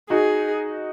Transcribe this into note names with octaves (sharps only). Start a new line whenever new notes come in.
D#4 F#4 G#4